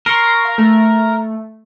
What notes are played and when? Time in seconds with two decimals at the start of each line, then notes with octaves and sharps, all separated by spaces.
0.06 A#4 C6 C#6
0.45 F5
0.58 A3